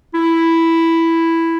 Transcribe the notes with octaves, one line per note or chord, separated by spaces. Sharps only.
E4